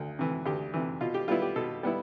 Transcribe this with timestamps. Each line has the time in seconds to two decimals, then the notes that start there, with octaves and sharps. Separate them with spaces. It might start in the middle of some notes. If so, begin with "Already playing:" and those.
Already playing: D2
0.19 C3 E3
0.46 D2 G4
0.74 C3 E3
1.01 B2 F4
1.14 G4
1.28 G3 B3 E4 F4
1.42 G4
1.56 B2 A4
1.83 G3 B3 E4